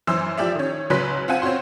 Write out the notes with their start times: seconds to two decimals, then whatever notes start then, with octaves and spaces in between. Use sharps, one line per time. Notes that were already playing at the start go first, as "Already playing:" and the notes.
0.07 F#2 E3 C5 E6
0.38 F3 G4 D5 E5
0.55 D#3 C#4
0.90 C#2 C#3 F#3 B4 C6 B6
1.28 C4 F4 F#5 G#5
1.42 C4 C#4 F4 F#4 C6